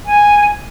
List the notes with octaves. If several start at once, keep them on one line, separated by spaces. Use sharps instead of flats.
G#5